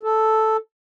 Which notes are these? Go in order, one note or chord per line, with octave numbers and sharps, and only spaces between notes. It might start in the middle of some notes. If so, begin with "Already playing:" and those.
A4